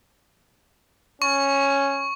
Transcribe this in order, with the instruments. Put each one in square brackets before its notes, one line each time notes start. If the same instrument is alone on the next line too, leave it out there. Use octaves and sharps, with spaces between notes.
[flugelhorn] C#4 [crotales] C#6